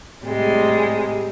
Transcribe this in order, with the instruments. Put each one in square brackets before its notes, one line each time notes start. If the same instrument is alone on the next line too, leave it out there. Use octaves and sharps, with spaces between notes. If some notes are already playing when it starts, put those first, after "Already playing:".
[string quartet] A2 C3 G3 G#3